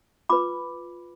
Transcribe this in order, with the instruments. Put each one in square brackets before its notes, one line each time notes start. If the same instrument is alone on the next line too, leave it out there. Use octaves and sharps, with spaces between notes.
[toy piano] F4 B4 B5 D6